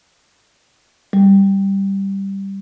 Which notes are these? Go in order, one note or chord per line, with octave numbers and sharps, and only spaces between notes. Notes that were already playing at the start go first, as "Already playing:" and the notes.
G3